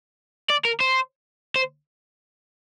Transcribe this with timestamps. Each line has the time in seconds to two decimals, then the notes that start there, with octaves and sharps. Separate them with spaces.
0.50 D5
0.65 A#4
0.80 C5
1.56 C5